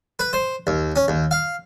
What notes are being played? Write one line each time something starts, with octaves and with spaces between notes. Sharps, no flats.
B4
C5
D#2
C#4
D#2
F5